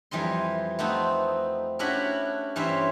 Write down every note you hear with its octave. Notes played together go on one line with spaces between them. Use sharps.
F2 E3 G3 D#5 C6
A3 B3 C4 D#4
C#4 D4 E4 F#4 G4 B5
G2 E3 G3 C#4 C5 E5